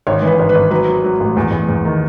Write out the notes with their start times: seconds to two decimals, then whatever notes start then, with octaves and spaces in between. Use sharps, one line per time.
0.07 G#1 C#5
0.22 E3
0.27 B4
0.39 G#1
0.49 B4
0.55 G#1
0.71 F#3 B4
0.88 F#3
1.04 F#3
1.20 A1
1.37 E2
1.52 E2
1.69 E2
1.85 D#3